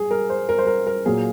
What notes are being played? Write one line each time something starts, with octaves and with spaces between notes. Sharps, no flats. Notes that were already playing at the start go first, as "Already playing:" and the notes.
Already playing: G#4
A#4
C5
A#4
C5
A#4
A#4
A#2 F#3 A#3 G#4